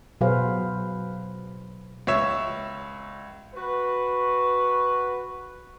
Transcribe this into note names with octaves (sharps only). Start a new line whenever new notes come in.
B2 F#3 G#4 B4 C5 F5
C#2 C#5 E5 E7
F#4 B4